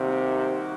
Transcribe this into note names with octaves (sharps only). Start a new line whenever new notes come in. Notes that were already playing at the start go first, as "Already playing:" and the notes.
Already playing: C3 D#3 G3 A#3 D#4 F#4